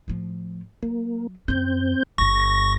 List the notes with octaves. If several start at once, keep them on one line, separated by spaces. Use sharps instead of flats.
A2 F3
F#3 A#3
F#2 C4 C#4 G6
G1 G2 C#6 A#6